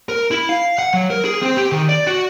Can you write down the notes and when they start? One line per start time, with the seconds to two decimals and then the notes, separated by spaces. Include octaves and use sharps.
0.09 A#4
0.31 E4
0.49 F5
0.79 F#5
0.93 F#3
1.10 A#4
1.25 G#4
1.42 C4
1.57 G4
1.72 D#3
1.89 D5
2.07 F#4